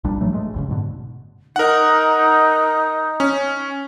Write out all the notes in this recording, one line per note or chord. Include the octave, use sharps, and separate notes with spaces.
B1 A#2 G3 D4
A2 E3 F#3 A3
G#3 A3
A1 F#2 C#3
G#2 B2 D3
D#4 A#4 F#5
C#4